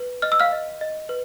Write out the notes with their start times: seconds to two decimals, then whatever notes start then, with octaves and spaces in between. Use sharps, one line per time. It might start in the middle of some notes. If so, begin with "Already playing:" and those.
Already playing: B4
0.22 D#5 F6
0.32 E6
0.40 F5 F6
0.52 D#5
0.81 D#5
1.09 B4